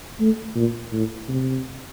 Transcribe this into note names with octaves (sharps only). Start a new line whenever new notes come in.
A3
A#2
A2
C3